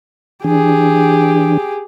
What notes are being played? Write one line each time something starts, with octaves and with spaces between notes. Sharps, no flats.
E3 D4 G4 G#4